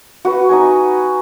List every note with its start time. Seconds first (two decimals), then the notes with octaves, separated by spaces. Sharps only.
0.25 F#4 B4
0.49 D#4 D#5 G#5